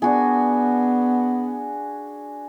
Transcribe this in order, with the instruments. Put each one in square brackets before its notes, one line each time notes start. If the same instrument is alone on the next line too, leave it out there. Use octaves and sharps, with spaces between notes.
[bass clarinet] B3 [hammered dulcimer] D4 F#4 G#4